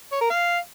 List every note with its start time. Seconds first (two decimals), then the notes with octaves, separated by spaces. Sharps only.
0.12 C#5
0.21 A#4
0.30 F5